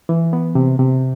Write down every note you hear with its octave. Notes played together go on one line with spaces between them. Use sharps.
E3
B3
C3
C3